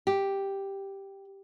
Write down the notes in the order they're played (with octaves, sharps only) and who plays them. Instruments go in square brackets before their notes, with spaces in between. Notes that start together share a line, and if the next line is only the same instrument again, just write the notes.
[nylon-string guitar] G4